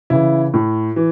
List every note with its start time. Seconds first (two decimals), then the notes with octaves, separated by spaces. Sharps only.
0.10 C#3 E3 E4
0.54 A2
0.96 E3